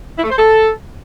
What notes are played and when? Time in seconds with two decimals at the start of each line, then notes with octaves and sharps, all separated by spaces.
0.17 E4
0.23 A3
0.30 C5
0.36 A4